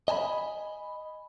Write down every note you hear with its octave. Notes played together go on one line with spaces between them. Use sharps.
D#5 G#5 A5 B5